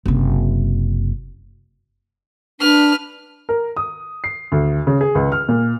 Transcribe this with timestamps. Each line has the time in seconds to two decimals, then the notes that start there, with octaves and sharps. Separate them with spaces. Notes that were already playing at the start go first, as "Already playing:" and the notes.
0.06 F#1 C3
2.60 D4 B4 F6
3.49 A#4
3.77 D#6
4.24 C7
4.52 D2
4.87 C#3
5.01 G#4
5.15 C#2
5.32 F6
5.48 A#2